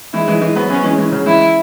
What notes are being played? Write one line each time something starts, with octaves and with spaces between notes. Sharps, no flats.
E3 G#3 E4
E3 G#3
E3 G#3
F#3 B3
F#3 B3 C#4
E3 G#3
E3 G#3
C#3 F#3
E3 G#3 E4